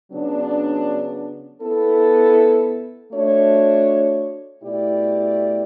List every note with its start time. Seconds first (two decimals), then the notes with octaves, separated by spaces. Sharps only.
0.11 C#3 F#3 B3 D4
1.61 B3 E4 A4
3.12 A3 D4 F#4 C#5
4.63 B2 A3 E4 G4 D5